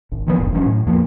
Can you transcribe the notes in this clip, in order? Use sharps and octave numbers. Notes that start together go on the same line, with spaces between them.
G#1
D#3 F3 G#3 B3
E1 A1 F2
E3 F#3 C4 C#4
A2
E2 F3 A#3